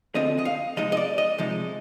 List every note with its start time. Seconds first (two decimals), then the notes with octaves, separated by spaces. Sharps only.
0.15 D2 D3 F3 C4 D#5
0.39 D#5
0.45 F5
0.77 C3 F3 G#3 D#4 D#5
0.92 D#5
0.97 D5
1.18 D#5
1.38 C3 F3 G#3 D#4